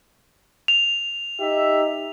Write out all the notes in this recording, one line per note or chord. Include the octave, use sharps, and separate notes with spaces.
F7
D#4 G4 E5